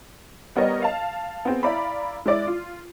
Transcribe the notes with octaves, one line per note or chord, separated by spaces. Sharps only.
G3 B3 A#4 C#5 D#5
F5 A5
B3 C4 G#4
E4 D5 F5 A#5 B5
G#3 E4 D5 D6
F4